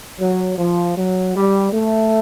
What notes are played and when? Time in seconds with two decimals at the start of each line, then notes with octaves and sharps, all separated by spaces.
0.21 F#3
0.58 F3
0.96 F#3
1.35 G3
1.73 A3